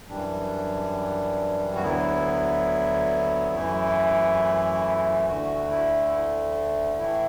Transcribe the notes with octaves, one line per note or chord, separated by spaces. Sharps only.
F#2 E3 G3 D4
F#4
D2 D3 F#3 B3 E4
F#2 E3 A3
D2 D3 A3 F#4
E4
A2 E3 A3 E4